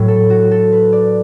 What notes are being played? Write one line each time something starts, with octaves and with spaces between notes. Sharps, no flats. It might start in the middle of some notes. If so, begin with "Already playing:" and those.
Already playing: A2 F#3
A4
F#4
A4
B4
D5